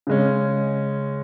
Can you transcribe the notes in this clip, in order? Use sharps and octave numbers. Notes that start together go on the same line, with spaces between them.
C#3 G#3 C#4